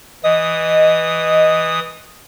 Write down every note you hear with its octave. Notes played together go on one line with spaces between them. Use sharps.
E3 D#5 D#6